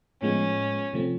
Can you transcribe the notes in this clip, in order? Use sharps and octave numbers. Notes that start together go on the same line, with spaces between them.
A2 F3 G#3 B3 C#4
C3 F3 A3 C4